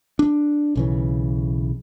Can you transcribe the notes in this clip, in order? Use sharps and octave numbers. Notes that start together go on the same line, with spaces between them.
D4
B1 C#3 E3